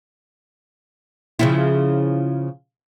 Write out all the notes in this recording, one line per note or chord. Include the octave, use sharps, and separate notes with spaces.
C#3 F3 E4